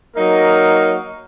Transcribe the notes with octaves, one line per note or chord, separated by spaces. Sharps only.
F#3 A#3 D#4 A#4 D#5